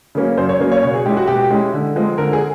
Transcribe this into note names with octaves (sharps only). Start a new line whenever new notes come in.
C#3 F#3 A#3 C#4
F#2 C5
C#5
C#3 F#3 A#3 C#4
C#5
B2 C#5
G#4
G#3 C#4 E4 G4
F#4
B2 G4
G#3 C#4 E4
D3
F3 G#3 C4
D3 A#4
G#4